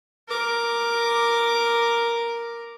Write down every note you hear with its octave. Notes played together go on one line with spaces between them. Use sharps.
A#4 D6